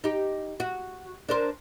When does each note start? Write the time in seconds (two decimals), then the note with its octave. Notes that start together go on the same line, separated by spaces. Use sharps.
0.04 D#4 G4
0.60 F#4
1.29 D4 A#4 C5